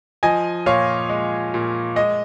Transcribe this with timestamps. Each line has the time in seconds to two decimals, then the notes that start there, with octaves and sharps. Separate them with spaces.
0.23 F3 D#5 G#5
0.66 A#2 C#5 F5
1.09 G#3
1.54 A#2
1.96 G#3 D#5